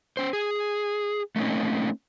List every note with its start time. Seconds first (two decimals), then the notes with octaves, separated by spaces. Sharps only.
0.17 C#4 C5
0.33 G#4
1.36 A3 A#3 C4 C#4 D#4